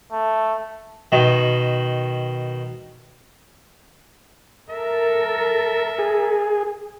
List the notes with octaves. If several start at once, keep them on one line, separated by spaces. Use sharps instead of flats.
A3
B2 D#3
A4 A#4 E5
G#4